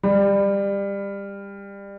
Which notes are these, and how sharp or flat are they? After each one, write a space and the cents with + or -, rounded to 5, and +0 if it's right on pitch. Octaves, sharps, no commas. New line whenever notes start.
G3 +25